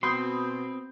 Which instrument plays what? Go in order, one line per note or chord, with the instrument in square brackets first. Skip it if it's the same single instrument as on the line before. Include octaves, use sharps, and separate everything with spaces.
[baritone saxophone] B2 [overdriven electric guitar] C4 [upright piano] B5 D#6 G6 [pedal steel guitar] C6